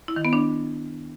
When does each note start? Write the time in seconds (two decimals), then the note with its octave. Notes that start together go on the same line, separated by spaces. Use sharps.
0.08 E4
0.16 D#3
0.25 B3
0.33 D4